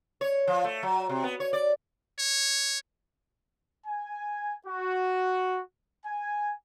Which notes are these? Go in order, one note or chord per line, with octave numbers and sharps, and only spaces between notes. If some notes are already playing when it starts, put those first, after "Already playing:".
C#5
F3
A3
F#3
C3
B3
C#5
D5
C#5
G#5
F#4
G#5